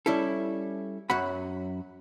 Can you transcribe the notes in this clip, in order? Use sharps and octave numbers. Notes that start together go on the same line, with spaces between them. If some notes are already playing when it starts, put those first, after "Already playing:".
G3 C#4 E4 A4
F#2 F#3 F#4 F#5 B5